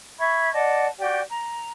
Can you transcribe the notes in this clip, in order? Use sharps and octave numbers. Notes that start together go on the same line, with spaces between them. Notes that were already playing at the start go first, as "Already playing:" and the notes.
E5 B5 C#6 G#6
D5 D#5 F#5 A5
F#4 G4 D5 G5
A#5